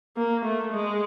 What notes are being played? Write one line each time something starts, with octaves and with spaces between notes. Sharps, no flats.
A#3
A3
G#3